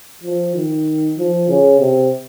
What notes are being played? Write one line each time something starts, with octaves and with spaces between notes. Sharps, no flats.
F3
D#3
F3
C#3
C3